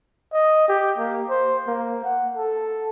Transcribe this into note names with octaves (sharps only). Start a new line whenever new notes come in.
D#5
G4
A#3
C5
A#3
F#5
A4